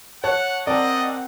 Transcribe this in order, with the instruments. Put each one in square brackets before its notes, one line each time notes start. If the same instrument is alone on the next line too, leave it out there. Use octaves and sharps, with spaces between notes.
[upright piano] C#5 A5 F#6 [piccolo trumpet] F#5
[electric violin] C4 F#5 [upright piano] A#4 A5 [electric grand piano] D5 [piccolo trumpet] D#5